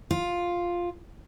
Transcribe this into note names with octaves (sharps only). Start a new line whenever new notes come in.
F4